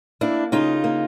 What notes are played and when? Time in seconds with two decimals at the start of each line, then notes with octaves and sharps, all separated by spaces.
0.21 A#3 D4 E4
0.52 C#3 D#4 F4
0.84 A#3